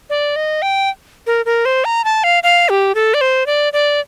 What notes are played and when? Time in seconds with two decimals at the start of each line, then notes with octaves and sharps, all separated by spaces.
0.10 D5
0.36 D#5
0.62 G5
1.27 A#4
1.46 A#4
1.65 C5
1.85 A#5
2.04 A5
2.24 F5
2.43 F5
2.69 G4
2.95 A4
3.14 D5
3.21 C5
3.46 D5
3.73 D5